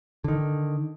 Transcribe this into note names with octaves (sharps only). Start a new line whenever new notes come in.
D3 D#3